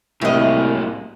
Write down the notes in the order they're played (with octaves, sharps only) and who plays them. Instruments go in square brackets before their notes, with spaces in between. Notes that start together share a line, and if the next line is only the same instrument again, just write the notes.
[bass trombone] C2 [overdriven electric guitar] F#2 A#3 [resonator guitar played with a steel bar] A2 D#5